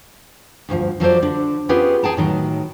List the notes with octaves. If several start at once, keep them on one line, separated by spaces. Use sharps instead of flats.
D2 G2 F3
F3 F#3 A4 C5 D5
D3 D4
B3 C#4 F4 G4 G#4 B4
G#4 G5 A5 A#5
A2 D#3 F#3